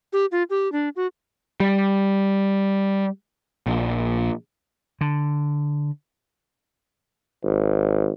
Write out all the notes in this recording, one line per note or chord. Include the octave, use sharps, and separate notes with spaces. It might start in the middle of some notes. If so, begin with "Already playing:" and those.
G4
F4
G4
D4
F#4
G3
A#1
D3
G#1